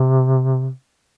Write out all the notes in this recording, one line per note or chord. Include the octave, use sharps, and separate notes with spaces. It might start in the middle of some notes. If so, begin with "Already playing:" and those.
Already playing: C3